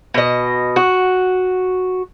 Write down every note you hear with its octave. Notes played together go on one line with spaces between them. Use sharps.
B2 D#5
F#4